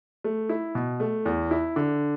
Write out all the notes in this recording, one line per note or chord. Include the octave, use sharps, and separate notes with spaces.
A3
E4
B2
A3
E2
E4
D3